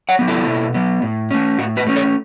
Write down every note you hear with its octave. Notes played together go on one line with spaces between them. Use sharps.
C#5 F#5
F#3 B3
E4 A4
B2
F#3 B3
A2
A3 C#4
A2 F#4
F#4 B4
A3 C#4
A4 C#5